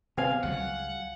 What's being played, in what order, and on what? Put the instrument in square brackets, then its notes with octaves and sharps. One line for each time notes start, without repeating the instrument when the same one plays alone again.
[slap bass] C3 [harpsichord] B3 C4 [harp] F5 G#5
[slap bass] C#2 F#3 G3 [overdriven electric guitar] F#5